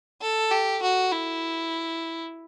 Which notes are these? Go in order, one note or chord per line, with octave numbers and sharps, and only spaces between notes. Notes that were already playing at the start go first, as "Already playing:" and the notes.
A4
G4
F#4
E4